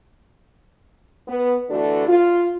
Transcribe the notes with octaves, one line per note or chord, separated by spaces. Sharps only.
B3
D3 E3 A3 D4 F#4 A4
F4